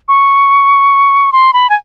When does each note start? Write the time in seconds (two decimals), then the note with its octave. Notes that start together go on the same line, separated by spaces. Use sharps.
0.08 C#6
1.32 C6
1.53 B5
1.69 G#5